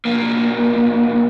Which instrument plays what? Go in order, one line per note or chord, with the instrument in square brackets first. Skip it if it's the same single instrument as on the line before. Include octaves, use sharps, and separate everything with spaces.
[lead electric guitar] B1 A#3